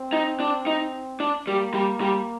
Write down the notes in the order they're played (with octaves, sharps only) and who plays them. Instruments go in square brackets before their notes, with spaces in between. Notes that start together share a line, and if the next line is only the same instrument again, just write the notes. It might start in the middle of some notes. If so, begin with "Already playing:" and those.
Already playing: [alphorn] C4
[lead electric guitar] D#4
D4
D#4
D4
[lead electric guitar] G3 [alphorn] A#3
[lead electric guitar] G3
G3